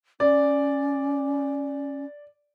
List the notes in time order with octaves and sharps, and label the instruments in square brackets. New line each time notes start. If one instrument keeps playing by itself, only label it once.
[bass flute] C#4 [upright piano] D5